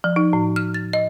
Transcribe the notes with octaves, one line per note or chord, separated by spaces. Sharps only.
F3
D#4
A2
F6
A6
D#5